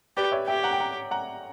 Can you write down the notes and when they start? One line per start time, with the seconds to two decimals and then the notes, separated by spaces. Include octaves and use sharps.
0.17 G4 B4 D5
0.32 C#5 E5
0.47 G4 E5 G5
0.64 F#5 A#5
0.73 G5
0.80 F#5 A#5
1.11 F#5 A#5